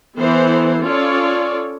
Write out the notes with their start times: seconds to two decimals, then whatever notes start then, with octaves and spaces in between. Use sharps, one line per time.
0.17 E3 B3 A4 C5
0.82 C#4 F4 A4 C#5 D5